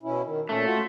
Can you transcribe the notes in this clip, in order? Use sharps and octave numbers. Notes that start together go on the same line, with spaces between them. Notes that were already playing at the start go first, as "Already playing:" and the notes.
B2 C#4 E4
D#3
A#2 A3 C#4
F4 F#4